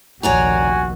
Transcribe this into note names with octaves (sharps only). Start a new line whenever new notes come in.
F1 A#1 D#2 F#4 C#5 D5 G#5 A#5